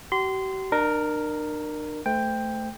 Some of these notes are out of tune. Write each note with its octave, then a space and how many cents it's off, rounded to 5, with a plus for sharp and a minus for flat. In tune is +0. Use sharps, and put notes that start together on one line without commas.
G4 -45 C6 -20
D4 +40 A#4 +0
A3 +0 C5 -30 G5 +10